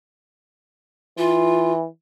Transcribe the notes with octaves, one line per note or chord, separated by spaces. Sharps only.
E3 F4